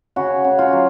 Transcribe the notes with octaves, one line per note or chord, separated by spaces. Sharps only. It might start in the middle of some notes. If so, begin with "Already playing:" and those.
C#3 F#4
C#3
F4
F#3